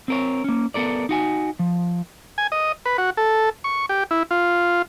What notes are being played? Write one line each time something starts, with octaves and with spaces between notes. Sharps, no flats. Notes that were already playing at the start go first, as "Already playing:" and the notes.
C4 A#4 C#5
A#3 C#4
B3 A4 A#4 D5
D#4 F#4 G#5
F3
G#5
D#5
B4
F#4
A4
C#6
G4
E4
F4